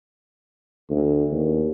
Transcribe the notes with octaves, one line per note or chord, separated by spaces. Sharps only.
D2
D#2